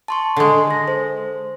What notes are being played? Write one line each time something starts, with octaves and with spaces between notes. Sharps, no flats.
A5 C6 C#6
D3 G#3
A4 A#6
C5